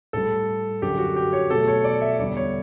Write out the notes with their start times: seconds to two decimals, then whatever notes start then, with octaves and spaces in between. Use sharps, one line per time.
0.13 A2 G3 A4
0.81 F#2 D3 F#3 G4
0.98 F#4
1.16 G4
1.33 C#5
1.50 B2 F#3 A3 A4
1.68 C#5
1.84 D5
2.02 E5
2.19 E2 D3 G3 D5
2.37 C#5